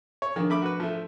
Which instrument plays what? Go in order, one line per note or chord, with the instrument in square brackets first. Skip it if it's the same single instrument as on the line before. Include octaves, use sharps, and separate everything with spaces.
[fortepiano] C#5 [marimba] C#6
[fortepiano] D#3 [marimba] F3 D4
[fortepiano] A3 B5 D6
F#4 B4
F3 A3